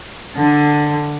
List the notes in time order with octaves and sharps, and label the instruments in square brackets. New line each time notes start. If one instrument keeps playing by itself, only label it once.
[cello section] D3